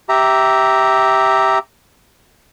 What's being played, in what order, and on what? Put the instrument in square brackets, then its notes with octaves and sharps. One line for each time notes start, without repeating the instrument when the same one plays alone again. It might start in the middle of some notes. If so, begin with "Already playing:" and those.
[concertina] G4 E5 A#5